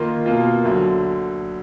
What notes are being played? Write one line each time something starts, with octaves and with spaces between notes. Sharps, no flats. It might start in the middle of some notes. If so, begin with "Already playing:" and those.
Already playing: D#3 A#3 F4
B2 A#3 F4
D2 D3 F#3